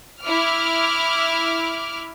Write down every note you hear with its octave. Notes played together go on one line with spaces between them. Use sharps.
E4 D6 F6